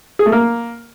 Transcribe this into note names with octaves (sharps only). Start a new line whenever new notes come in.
G#4
A3
A#3